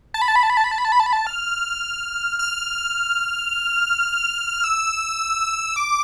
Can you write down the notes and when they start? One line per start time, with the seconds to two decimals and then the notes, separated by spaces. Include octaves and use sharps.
0.14 A5
0.22 B5
0.28 A5
0.36 B5
0.43 A5
0.50 B5
0.57 A5
0.64 B5
0.71 A5
0.78 B5
0.85 A5
0.92 B5
1.00 A5
1.06 B5
1.13 A5
1.27 F6
2.39 F6
4.64 E6
5.76 D6